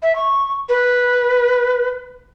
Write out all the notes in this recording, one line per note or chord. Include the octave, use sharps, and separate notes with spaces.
E5
C#6
B4